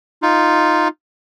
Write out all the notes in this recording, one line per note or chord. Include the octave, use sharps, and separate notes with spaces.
D#4 F4